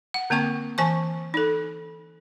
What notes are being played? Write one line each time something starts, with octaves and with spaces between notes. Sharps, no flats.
F#5
D3 A#3 C4 G5 C#6
E3 G#5 A5 C#6
D#4 A4